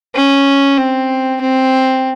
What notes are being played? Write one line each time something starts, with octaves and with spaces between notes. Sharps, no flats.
C#4
C4
C4